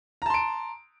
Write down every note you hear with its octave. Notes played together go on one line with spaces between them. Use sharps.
A5 A#5 C6 D7